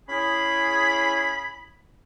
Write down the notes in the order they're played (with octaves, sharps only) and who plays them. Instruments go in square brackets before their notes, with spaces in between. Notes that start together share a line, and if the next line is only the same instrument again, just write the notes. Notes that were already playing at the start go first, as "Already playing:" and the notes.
[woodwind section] C#4 E4 G#4 [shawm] B5